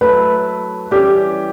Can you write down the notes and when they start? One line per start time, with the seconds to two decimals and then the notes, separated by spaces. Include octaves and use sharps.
0.01 F#3 A3 E4 A4 B4
0.91 E3 G3 C#4 G4